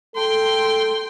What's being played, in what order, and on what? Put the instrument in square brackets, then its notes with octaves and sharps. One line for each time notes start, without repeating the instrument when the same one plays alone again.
[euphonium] A4 [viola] G5 C6